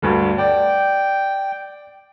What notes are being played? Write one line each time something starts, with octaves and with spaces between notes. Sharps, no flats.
D2 G2 D3
D5 G5